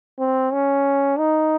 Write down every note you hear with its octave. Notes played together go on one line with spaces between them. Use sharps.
C4
C#4
D#4